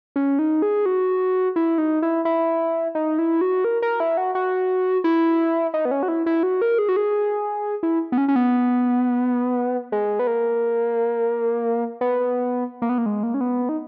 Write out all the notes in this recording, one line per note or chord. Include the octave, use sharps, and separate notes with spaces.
C#4
D#4
G#4
F#4
E4
D#4
E4
E4
D#4
E4
F#4
A#4
A#4
E4
F#4
F#4
E4
D#4
B3
C#4
F#4
E4
E4
F#4
A#4
G#4
F#4
G#4
E4
B3
C#4
C#4
B3
G#3
B3
A#3
B3
A#3
B3
A#3
G#3
A#3
C#4
B3
D#4